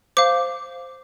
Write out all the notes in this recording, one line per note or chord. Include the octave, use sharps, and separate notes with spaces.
C5 F5 D6